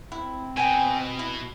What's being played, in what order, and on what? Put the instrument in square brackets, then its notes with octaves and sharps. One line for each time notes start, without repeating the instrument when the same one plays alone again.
[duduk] C4 [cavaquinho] E4
[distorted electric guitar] B2 [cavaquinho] G5 G#5
[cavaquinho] E4